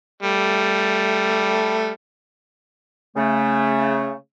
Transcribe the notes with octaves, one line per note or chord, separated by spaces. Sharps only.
G3 A3
C#3 A3